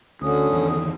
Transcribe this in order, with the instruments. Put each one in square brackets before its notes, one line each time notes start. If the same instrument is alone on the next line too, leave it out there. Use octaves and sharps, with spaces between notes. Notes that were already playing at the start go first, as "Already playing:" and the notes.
[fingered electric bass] D2 [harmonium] D3 C#4 [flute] D#6
[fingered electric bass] G1 E2 D#3